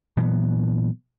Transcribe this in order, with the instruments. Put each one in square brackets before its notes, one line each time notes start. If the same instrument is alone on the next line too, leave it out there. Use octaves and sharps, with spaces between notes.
[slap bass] A#2 E3 F#3 B3